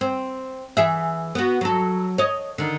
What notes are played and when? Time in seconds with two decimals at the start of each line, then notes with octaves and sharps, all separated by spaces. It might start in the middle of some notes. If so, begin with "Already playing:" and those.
0.01 C4
0.77 E3 G#4 E5
1.35 B3 F#4
1.61 F#3 A4
2.18 C#5 D#5
2.58 D3 D#3